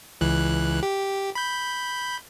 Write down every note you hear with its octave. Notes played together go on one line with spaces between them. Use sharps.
C#2 E3 F#6
G4
B5 G6